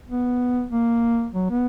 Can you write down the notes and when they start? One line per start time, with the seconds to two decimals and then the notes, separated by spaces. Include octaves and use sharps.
0.08 B3
0.71 A#3
1.34 F#3
1.51 B3